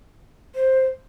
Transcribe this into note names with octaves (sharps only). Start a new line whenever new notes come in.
C5